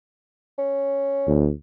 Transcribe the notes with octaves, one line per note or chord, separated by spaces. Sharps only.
C#4
D2